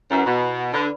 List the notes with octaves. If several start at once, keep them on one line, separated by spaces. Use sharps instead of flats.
F#2 E4 B4 F#5
B2
D3 B4 D5 B5